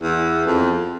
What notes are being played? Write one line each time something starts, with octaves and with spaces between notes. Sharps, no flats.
E2
F2